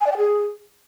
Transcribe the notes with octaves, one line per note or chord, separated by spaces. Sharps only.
G#5
D5
G5
G#4